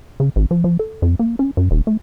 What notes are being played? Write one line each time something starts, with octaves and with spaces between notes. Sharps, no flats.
C#3
G#1
F3
F3
A4
F2
A#3
C#4
F#2
D#1
A3